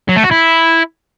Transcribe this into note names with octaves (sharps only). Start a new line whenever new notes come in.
F#3
A3
F#4
E4